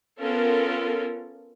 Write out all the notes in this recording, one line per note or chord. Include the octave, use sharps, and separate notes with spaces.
B3 C#4 F4 A4 A#4